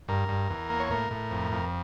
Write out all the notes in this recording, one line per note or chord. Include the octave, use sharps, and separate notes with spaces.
G2 A#4
G2
E2
A#3
C#5
A2 A#4
A2
F2
F2